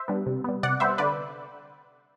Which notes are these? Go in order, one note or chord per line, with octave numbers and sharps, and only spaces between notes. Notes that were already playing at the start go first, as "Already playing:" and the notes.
Already playing: C5 E5
G3 B3 D4
C3
G3 B3
C3 D5 F#5
G3 B3 C5 E5
D3 B4 D5